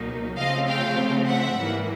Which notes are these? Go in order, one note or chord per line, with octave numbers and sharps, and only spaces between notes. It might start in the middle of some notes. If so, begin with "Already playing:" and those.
Already playing: C#2 B2 F#3 A#3 D#4
C#3 F3 A3 C4 D#5 F5
F5 G5
E5 F#5
G#2 E3 G3 A#3